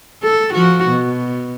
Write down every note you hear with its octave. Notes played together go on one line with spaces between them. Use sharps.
A4
F3 F#4
B2